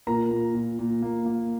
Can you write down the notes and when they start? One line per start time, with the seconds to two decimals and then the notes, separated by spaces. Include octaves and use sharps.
0.07 A#2 A#4 A#5
0.31 A#2
0.55 A#2
0.79 A#2
1.02 A#3
1.26 A#3